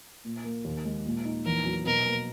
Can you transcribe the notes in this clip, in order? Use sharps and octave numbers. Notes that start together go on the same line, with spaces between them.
A#2
A#3
D#2
G#3
A#2
D#4
E2 A#4
F#3
B2 A#4
A#3